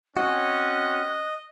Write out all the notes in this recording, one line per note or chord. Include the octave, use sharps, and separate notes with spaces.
C4 C#4 F#4 D#5 F#6